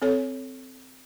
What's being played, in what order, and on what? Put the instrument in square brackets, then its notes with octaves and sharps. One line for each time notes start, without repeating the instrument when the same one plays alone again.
[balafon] C4 A4 C#5